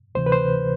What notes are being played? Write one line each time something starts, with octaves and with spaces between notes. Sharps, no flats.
D2 C3 E3 C5
B4
C5